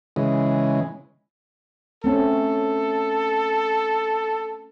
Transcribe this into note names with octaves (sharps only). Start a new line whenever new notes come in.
C#3 E3 G#3
A3 C4 C#4 A4